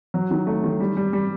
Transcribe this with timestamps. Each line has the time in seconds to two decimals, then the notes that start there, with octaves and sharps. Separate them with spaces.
0.14 F#3
0.31 D#3
0.47 A3
0.64 D#3
0.80 G3
0.97 G3
1.13 G3